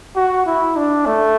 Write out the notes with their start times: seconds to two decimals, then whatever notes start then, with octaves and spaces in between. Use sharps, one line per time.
0.16 F#4
0.46 E4
0.76 D4
1.06 A3